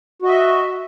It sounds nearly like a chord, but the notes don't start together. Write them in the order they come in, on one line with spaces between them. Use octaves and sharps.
F#4 D#5 E5